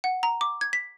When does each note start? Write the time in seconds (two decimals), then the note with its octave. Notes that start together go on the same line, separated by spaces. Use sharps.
0.04 F#5
0.23 A#5
0.41 D6
0.61 G#6
0.73 B6